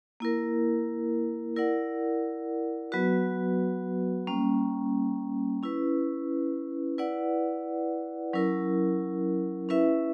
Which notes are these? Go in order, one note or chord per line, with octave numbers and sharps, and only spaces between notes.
A#3 E4 A#4
E4 A#4 D5 F#5
F#3 B3 F#4 B4
G3 A#3 C#4
C#4 E4 B4
E4 B4 D5 F#5
F#3 C#4 E4 A#4
C#4 E4 B4 E5